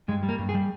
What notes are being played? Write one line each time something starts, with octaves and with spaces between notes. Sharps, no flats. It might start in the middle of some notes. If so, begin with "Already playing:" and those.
G2 G#3
G3
A#3
G2
G#4
G3